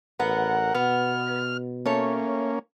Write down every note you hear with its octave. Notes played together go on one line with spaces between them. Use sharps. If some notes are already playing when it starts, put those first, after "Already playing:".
A1 B3 A#4 F#5
B2 B3 F6
A3 A#3 C#4 C#5